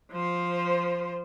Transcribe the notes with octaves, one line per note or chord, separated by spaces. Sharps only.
F3 C5